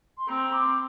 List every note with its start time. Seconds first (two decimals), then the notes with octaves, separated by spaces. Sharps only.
0.17 C6
0.28 C4 A#5
0.52 D6